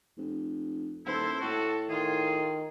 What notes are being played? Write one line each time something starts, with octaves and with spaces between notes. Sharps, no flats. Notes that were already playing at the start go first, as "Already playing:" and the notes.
F1
D#1 E4 A4 C5
A2 F#4 A4
D#3 F4 G#4